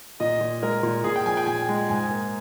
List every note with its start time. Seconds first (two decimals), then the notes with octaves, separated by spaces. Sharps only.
0.20 A#2 D#5
0.41 A#2
0.62 G#3 A#4
0.83 A#2
1.04 A#2 G#4
1.16 G5
1.26 F3 G#5
1.37 G5
1.47 A#2 G#5
1.69 G#3
1.89 G#2 G#5
2.10 A#3